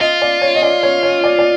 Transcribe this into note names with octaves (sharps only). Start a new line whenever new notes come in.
F4 D#5
D5
C#5
D#5
D5
C#5
C#5
D5
D5